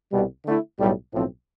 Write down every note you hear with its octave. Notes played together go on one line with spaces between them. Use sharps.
C2 B2 G3
D3 A3 E4
B1 A2 G3
B1 A2 F3 C4